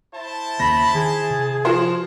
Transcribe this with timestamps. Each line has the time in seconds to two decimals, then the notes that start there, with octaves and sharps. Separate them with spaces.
0.15 E4 C5 A5
0.60 D#2 C#3 A#3 B5 A#6
0.94 D#3 G#4
1.30 C3
1.65 F3 F#4 C5